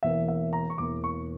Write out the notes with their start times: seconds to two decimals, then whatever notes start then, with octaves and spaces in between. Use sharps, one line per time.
0.03 E1 E2 E3 A#3 E5
0.28 E5
0.53 A#5
0.70 C#6
0.78 E1 E2 E3 A#3 D6
1.04 C#6